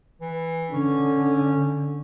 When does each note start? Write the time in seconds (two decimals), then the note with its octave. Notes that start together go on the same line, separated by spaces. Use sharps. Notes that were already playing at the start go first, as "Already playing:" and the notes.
0.21 E3
0.72 D3 C#4